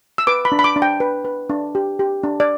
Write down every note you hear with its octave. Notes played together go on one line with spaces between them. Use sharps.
E6
B4 D6
B5
D4
B5
D6
D4
G5
B4
B4
D4
G4
G4
D4
D5